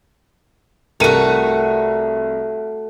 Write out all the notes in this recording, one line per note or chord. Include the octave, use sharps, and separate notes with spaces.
C2 A3 F#4 A#4 D#7